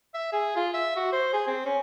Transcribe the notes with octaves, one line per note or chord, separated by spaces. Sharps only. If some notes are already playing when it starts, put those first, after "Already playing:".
E5
G#4
F4
E5
F#4
C5
G#4
C4
C#4